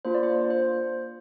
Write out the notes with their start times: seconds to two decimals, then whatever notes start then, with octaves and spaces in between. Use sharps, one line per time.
0.05 A#3 D4 F4 C5
0.14 D5
0.23 C5
0.50 C5